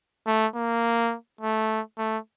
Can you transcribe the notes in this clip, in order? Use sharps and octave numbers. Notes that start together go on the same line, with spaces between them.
A3
A#3
A3
A3